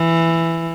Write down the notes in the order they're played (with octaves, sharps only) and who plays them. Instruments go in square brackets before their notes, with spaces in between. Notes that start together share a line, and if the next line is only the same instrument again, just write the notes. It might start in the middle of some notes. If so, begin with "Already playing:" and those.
Already playing: [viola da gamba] E3